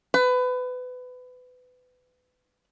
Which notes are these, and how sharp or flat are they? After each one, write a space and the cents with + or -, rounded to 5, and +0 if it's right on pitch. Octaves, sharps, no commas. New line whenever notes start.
B4 +25